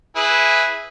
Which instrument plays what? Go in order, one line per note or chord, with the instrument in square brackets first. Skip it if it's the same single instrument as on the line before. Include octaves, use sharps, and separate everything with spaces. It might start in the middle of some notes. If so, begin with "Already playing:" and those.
[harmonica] E4 G#4 B4